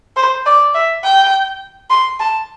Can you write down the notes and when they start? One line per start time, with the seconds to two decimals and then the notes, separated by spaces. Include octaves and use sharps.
0.16 C5
0.46 D5
0.74 E5
1.04 G5
1.90 C6
2.19 A5